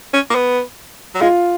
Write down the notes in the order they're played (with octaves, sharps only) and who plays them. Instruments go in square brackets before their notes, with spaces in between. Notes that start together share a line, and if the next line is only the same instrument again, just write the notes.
[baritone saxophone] C#4
A#3
B3
F#3
[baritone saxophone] G#3 [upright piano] F4